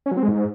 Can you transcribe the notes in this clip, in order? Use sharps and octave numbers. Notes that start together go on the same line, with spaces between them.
C#4
F#3
C4
G#3
G#2